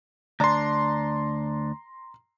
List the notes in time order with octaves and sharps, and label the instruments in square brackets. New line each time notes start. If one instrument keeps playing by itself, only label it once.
[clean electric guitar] D2 D4 [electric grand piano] A#5 C6